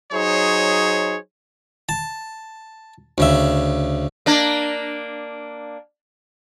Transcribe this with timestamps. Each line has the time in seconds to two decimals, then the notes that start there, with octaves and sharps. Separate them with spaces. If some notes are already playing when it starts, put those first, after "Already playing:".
0.12 F#3 D#4 G#4 C5 C#5
1.89 A5
3.18 D2 C#3 E5
4.26 A#3 D4